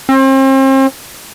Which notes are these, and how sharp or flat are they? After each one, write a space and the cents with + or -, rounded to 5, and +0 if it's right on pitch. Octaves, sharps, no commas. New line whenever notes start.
C4 +40